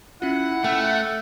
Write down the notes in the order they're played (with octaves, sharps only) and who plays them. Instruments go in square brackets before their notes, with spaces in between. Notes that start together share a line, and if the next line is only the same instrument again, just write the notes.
[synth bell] C#4 F4 [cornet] E4 [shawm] F#5
[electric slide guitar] A3 [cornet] E5 [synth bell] G5